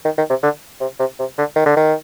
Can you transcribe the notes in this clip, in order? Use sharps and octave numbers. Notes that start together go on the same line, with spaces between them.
D#3
D#3
C3
D3
C3
C3
C3
D3
D#3
D3
D#3